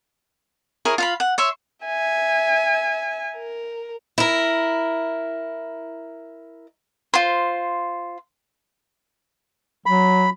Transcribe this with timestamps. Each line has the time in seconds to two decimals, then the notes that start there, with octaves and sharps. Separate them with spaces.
0.85 E4 G#4 A#4 C#5
0.98 F4 F5 B5
1.20 F#5
1.38 C#5 E5 C6
1.86 E5 G#5
3.36 A#4
4.18 E4 A#4
7.14 F4 C5
9.86 F#3 B5